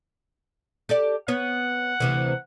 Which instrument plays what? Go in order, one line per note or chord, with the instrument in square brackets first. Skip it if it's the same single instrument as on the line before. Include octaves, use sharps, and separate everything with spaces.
[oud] G4 A4 D5
[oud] B3 C#5 [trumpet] F#5
[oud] D2 C3 E3